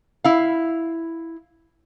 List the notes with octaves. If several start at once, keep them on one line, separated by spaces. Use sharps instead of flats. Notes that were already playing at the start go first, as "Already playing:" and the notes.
E4 F5